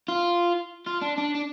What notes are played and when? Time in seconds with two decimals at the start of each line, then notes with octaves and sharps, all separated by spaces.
0.08 F4
0.86 F4
1.01 D4
1.18 D4
1.35 D4